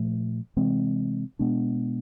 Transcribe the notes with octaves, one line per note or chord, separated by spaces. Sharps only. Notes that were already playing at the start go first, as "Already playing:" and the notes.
Already playing: A#2 F3 A3
C3 E3 G#3 C4
B2 G#3 B3 D4